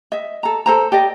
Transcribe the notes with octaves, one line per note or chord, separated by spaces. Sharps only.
D#5 E5
A4 A#5
A4 C5 A#5
G4 D5 D#5